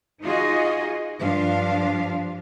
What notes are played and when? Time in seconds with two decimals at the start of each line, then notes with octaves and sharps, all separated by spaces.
0.23 D#4 F4 F#4 G#4 D#5
1.20 G2 F3 D4 F4 F5